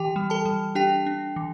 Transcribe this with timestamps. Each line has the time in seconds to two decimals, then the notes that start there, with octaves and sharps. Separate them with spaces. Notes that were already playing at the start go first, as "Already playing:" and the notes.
Already playing: E3 G4 G5
0.16 G3
0.30 A4 A5
0.46 G3
0.75 D4 G4 G5
1.06 D4
1.36 E3